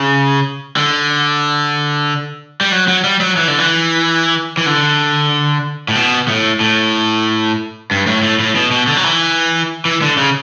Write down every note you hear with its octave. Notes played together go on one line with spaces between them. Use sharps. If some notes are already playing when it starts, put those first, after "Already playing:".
Already playing: C#3
D3
G3
F#3
F#3
G3
F#3
E3
D3
E3
E3
D3
A2
B2
A2
A2
G2
A2
A2
A2
B2
B2
D3
F#3
E3
E3
D3
C#3